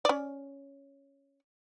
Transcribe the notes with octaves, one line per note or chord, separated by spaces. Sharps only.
C#4 D5